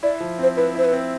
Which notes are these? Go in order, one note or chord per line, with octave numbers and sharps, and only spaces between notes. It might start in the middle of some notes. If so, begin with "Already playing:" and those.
E4 D5
F3
C4 C5
E4 B4
E4 C5
B4
C4